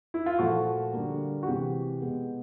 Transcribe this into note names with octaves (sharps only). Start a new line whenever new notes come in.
E4
F4
A#2 F3 A3 F#4
D3 G3 A#3
F#4
C3 E3 G#3 G4
B2 G#3 B3